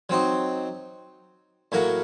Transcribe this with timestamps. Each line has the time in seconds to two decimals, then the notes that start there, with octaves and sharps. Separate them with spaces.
0.09 F#3 C4 D#4
1.72 A2 F#3 A#3 F#4 A#4